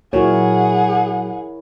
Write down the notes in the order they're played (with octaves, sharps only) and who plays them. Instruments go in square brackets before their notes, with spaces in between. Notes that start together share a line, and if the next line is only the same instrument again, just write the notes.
[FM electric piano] A#2 F#3 [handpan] E4 A#4 C#5 [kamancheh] G#4 F#5